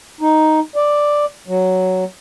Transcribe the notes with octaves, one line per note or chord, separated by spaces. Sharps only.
D#4
D5
F#3